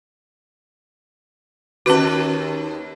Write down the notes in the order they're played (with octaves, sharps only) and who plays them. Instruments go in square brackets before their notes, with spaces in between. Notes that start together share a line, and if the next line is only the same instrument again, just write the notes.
[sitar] D#2 B4 [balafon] C#4 F#4